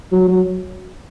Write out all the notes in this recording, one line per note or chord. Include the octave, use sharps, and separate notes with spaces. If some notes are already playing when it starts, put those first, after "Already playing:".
F#3
F#3